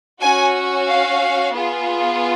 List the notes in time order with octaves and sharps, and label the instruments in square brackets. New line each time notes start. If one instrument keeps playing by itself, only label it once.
[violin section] C#4 F#4 G#5
F5
B3 F4 G#4